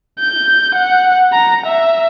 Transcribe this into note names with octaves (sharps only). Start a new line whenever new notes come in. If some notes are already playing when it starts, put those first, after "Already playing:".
G6
F#5
A#5
E5